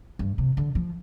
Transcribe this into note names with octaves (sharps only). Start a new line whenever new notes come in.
G2
C3
D3
F3